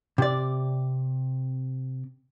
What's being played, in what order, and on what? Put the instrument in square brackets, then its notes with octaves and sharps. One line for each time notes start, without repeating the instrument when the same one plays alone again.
[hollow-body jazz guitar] C3 D5